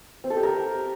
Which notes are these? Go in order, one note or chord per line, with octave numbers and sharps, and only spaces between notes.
C4
A4
G4
A#4